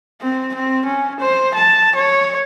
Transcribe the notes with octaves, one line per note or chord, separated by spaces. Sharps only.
C4
C4
C#4
C5
A5
C#5